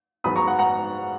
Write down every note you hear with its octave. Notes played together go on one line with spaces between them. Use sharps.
G#2 F#3 B3 B5 D#6
A#5 C#6
F#5
F#5 A#5